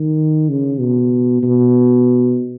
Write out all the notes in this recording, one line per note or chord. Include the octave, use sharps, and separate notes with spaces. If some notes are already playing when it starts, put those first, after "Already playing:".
Already playing: D#3
C#3
B2
B2